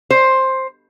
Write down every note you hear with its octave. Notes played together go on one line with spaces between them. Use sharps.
C5